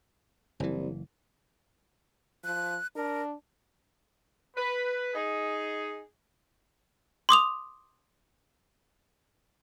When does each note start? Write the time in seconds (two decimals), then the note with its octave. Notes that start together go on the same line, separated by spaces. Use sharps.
0.60 F#1 C2 E3
2.44 F3 F#6
2.96 D4 A#4
4.56 B4
5.14 D#4 G#4
7.29 C6 D6 D#6 F7